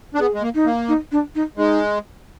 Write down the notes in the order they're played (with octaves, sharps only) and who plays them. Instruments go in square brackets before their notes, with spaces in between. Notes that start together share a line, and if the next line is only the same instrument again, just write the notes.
[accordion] D4
[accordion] B3 [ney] G#4
[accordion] G#3
A#3
[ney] D#4
[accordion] A#3
[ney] D#4
D4
D#4
[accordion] G#3 [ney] D#4